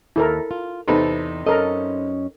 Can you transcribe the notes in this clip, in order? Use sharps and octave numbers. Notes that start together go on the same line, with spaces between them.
D#2 E4 A4 A#4
F4
E2 C3 D#4 A4 B4
F#2 C#4 A4 A#4 D#5